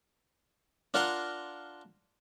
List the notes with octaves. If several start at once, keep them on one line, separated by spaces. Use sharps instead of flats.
D4 F4 A#4 F#5 A#5 C6